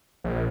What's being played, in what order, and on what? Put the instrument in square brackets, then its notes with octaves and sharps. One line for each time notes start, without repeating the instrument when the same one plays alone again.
[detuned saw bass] A#1